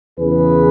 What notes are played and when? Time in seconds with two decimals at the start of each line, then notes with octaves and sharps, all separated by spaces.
0.20 E2 C#3 E3 G#4 B4